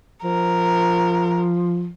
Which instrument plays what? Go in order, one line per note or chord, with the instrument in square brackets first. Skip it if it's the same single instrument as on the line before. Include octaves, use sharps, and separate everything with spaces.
[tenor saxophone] F3 [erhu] A#4